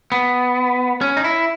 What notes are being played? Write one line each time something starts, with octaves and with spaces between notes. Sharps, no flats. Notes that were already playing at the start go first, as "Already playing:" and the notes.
B3
C#4
D#4
E4